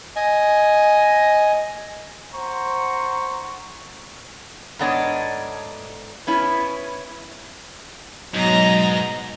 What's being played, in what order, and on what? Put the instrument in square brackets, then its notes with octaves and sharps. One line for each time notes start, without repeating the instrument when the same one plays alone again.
[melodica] D#5 G#5
[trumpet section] C5 F#5 A#5 C6 C#6
[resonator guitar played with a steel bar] G#2 A3 B3 D4 C#5 D#5
B3 C#4 E4
[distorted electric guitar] G#2 [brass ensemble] B2 F#3 [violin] D#5 A#5